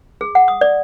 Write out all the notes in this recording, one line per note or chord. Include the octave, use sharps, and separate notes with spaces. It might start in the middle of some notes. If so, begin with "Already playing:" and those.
G#4
F#5
D#6
D5